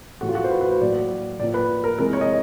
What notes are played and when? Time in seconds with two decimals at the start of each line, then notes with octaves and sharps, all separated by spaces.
0.21 A2 E3 A3 F#4
0.29 F4
0.35 F#4
0.44 C5
0.51 B4
0.61 B4
0.71 C5
0.80 A2 F#3 A#3 D5
1.40 A2 F3 A#3 D5
1.54 B4
1.84 A#4
1.98 C3 E3 G#3 A#4
2.13 C#5
2.21 D#5